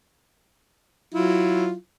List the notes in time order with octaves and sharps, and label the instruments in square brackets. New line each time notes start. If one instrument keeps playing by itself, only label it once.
[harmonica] F#3 E4 F4